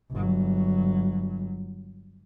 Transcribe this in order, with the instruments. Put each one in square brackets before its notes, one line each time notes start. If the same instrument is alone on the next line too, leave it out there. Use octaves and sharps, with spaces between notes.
[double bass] G1 F#3